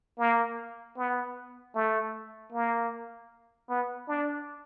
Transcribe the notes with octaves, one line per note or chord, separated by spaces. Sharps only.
A#3
B3
A3
A#3
B3
D4